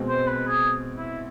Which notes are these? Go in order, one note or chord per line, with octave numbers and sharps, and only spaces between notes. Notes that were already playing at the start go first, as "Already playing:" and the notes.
Already playing: B2 G#3 C4
C5
B4
G#4
E4